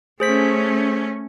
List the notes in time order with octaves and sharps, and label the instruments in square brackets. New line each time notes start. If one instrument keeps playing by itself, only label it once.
[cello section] A3 C#4 [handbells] G#4 C5 B6